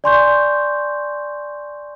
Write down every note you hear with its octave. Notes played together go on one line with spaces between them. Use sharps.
D5 G#5 C6 C#6 G6